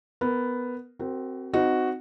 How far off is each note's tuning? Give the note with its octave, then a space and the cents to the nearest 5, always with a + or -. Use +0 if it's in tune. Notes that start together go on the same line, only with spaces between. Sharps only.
B3 +5 A#4 +0
C4 +0 F#4 +25 A#4 -20
C4 -25 D#4 +0 F#4 +0